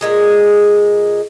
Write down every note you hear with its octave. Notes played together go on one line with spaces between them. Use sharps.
A#2 G#3 G#4